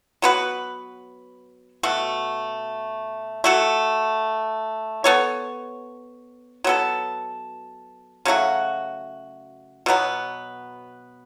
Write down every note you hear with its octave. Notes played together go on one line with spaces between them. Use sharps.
F#3 B3 F#4 B4
B2 A3 F#4
A3 F#4 A4
B3 A4 C#5
F#3 B3 A4
C#3 F#3 A3 F#4
B2 F#3 B3